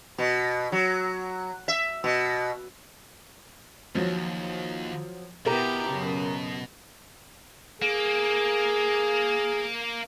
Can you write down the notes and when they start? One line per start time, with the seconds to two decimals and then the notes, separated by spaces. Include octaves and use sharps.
0.18 B2
0.72 F#3
1.68 E5
2.04 B2
3.95 D#2 F3 F#3
5.46 B2 B3 E4 G4 A#4
5.90 F#2 C#3
7.82 A#3 G#4